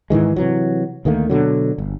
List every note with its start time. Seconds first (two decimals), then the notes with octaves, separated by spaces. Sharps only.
0.10 G#2 D#3 E3 G#3
0.36 C3 E3 F#3
1.05 D2 D#3 A3 A#3
1.30 B2 D3 F#3
1.78 G1